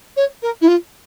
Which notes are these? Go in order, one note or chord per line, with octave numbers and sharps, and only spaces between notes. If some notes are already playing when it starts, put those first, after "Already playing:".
C#5
A#4
E4
F4